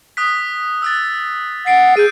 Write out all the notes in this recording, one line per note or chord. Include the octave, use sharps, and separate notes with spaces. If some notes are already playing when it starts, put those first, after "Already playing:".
D#6 F#6 B6
E6 F#6 A6
F#5 A6 C7 D7
G#4 G6 D#7